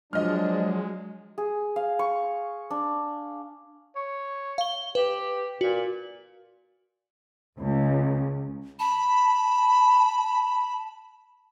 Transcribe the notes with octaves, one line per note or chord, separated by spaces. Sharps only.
F3 F#3 G#3 D4 D#5 F6
G#4
F5
C#6
D4
C#5
F5 G7
G4 B4
A#2 F#4
C#2
A5 B5